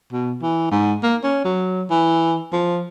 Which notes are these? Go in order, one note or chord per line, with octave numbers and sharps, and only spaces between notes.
B2
E3
G#2
A#3
C#4
F#3
E3
F3